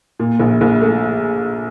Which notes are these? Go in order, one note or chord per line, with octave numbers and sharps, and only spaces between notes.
A#2
A#1
A#1
A3